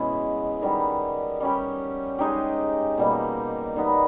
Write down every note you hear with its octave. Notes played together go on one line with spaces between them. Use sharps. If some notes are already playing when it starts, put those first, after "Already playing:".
Already playing: B2 G#3 B3 C#4 E4
D#3 G3 B3 G4
G3 C#4 G4
G#3 D#4 G4
B2 G3 A#3
D#3 G3 B3 D#4